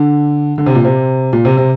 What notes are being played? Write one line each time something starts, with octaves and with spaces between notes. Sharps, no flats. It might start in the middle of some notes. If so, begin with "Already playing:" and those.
Already playing: D3
D3
C3
A#2
C3
A#2
C3
C3